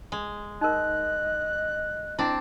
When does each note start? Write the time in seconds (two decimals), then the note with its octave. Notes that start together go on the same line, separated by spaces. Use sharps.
0.12 G#3
0.61 D#4 A#4 D#5 F#6
2.19 C4 D4 E4 D5